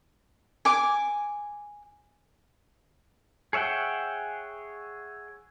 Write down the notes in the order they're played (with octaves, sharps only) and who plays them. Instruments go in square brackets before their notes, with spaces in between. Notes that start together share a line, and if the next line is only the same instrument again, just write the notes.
[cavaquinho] G#5 D6
[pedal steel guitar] G#4 C#5 E5 F#5 G5